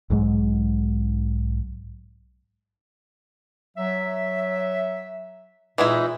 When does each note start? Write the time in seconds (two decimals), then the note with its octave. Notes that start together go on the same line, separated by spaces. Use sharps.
0.10 B1 G#2 F#3 G#3
3.77 F#3 E5
5.78 A#2 E3 G#3 D#4 E4